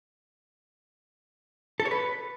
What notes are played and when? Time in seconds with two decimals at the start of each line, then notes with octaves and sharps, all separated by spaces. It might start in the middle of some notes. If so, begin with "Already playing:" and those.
1.80 A4
1.85 C#5
1.91 B4